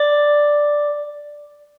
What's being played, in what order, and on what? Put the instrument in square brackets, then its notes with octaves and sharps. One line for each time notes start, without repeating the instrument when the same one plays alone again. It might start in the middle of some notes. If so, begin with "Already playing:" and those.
Already playing: [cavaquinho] D5